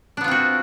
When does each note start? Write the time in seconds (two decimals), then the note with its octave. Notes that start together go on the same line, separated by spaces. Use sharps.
0.17 D4
0.21 B3
0.24 F4
0.28 C4
0.31 F#4